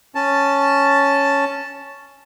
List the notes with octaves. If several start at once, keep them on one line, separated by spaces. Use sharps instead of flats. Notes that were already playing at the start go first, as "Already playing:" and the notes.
C#4 A5